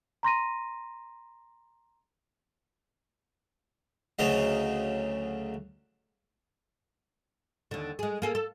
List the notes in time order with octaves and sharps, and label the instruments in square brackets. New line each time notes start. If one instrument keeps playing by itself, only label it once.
[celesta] A#5 C6 A#6 D#7
[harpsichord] D2 C#3 F#3 D#5
[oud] D#2 D3
G#3 G#4
A#3 G#4 A4
A4